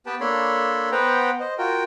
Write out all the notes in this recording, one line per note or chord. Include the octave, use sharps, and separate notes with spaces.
B3 G4 B4 G5 A5
A#3 D4 A4 C#5 B5 C6
B3 B4 C5 F#5 G5 A#5
C5 D#5
F4 F#4 A#4 G5